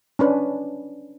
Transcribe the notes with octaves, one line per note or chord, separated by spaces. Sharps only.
C#4 D4 B4